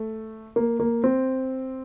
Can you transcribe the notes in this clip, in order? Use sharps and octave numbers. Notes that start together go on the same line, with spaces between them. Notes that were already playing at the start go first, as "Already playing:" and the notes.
Already playing: A3
A#3
A#3
C4